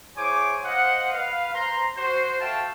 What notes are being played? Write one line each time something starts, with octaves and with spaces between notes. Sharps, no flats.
E4 G#4 C5 C#5 G#5 D6
C5 D#5 F5 F#5
B4 F5
C5 A#5 C6
F#4 C5
F#4 A4 E5 F5 G5 A5